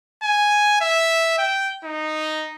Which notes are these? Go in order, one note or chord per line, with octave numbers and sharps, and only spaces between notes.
G#5
E5
G5
D#4